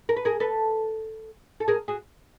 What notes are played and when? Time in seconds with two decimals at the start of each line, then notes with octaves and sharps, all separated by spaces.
0.09 A#4
0.16 B4
0.25 G#4 A#4
0.40 A4 B4
1.60 A4
1.68 G#4 A#4
1.88 F#4 G#4